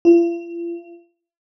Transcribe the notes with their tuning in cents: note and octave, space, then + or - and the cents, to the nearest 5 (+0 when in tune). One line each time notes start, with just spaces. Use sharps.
F4 -45